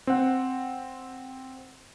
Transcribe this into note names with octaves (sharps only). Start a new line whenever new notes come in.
C4 F#5